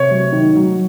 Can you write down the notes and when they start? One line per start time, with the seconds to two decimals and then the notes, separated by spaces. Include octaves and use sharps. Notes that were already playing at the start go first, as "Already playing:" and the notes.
Already playing: C3 C#5
0.11 F#3
0.32 D#3
0.56 F#3